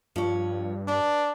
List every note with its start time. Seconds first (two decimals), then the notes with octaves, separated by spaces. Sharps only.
0.16 G2 F3 C#5
0.88 D4 B4